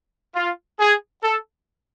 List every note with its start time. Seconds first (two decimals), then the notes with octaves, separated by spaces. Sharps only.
0.35 F4
0.80 G#4
1.23 A4